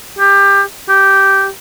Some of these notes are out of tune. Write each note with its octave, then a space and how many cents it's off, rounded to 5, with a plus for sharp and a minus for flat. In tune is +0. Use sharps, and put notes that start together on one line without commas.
G4 +20
G4 -10